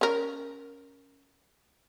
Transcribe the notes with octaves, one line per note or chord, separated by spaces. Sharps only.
C#4 A#4